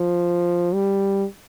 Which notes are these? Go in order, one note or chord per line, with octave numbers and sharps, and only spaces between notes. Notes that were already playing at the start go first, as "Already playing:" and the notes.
Already playing: F3
G3